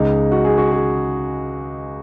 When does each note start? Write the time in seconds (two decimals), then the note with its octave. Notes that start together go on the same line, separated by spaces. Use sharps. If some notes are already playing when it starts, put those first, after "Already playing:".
Already playing: C#2 C#3 G#3 D#4
0.32 F#4
0.45 G#4
0.58 F#4
0.72 G#4